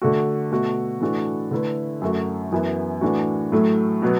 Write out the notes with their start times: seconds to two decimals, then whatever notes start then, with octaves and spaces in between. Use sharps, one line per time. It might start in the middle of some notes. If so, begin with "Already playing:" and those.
0.02 D3 A3 F#4
0.52 B2 A3 F#4
1.01 A2 E3 D4 F#4 A4
1.51 D3 A3 E4 B4
2.02 F#2 F#3 A3 F#4
2.52 F#2 E3 B3 E4 B4
3.01 A2 E3 D4 F#4
3.52 A2 F#3 A3
4.02 B2 F#3 B3